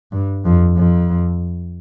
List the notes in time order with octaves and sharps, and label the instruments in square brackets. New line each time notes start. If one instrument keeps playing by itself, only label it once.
[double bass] G2
F2
F2